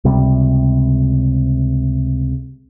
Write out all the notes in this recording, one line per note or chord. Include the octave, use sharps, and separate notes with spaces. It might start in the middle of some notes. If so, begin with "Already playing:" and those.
C#2 C3 G3